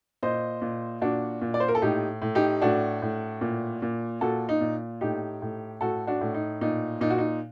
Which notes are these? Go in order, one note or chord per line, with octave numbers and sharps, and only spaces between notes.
A#2 C5 D#5
A#2
A#2 D4 F#4
A#2
D5
C5
A#4
A4
A2 D#4 G4
A2
D#4 G4
A2 D4 F#4
A2
A#2
A#2
A#2 F#4 A4
D#4
A#2
A2 D#4 G4
A2
A2 F#4 A4
D4 F#4
A2
D#4
A#2 D#4
A#2 D#4
F#4
D#4